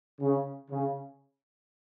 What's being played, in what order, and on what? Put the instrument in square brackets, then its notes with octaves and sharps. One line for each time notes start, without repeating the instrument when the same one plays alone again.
[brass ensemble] C#3
C#3